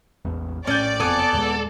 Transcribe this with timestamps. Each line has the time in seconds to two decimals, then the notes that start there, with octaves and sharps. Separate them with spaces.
0.25 E1 A1 E2
0.67 A#1 A2 A3 C#4 D5 G5
1.00 F#1 F2 C3 B3 A4 G#5 D6
1.33 D#2 A#2 G#3